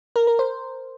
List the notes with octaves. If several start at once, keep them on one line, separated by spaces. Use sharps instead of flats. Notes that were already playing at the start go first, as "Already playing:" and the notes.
A#4
A#4
C5